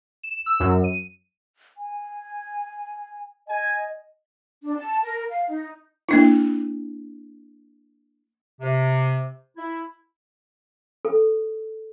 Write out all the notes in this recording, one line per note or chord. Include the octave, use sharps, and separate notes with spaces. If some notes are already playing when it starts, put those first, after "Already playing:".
E7
E6
F#2
D#7
G#5
D#5 G#5
D4
A5
A#4
F5
D#4
A#3 D4 E4
C3
E4
A4